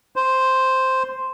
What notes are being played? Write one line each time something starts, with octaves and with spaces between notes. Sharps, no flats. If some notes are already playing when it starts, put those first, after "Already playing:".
C5